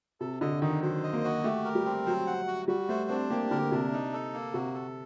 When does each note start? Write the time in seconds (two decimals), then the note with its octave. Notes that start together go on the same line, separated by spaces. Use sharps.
0.20 C3 A4
0.41 D3 D#5
0.62 D#3 D#4
0.82 F#3 C5
1.03 D#5
1.13 A#3
1.24 F#4
1.44 A3 G4
1.65 A#4
1.75 G3
1.85 C4
2.06 F#3 C5
2.27 F#5
2.48 F#4
2.68 G3 F#4
2.89 A3 C5
3.09 C4 D4
3.30 A#3 G4
3.51 D3 A#4
3.71 C3 D4
3.93 D#4
4.13 A4
4.34 A#3
4.54 C3 F#4
4.74 A4